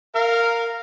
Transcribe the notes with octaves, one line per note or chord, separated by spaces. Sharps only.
A#4 F5